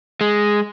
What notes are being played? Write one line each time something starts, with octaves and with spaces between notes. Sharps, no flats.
G#3